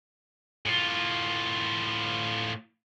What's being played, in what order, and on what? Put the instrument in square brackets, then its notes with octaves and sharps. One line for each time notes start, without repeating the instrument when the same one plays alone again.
[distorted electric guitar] A2 F4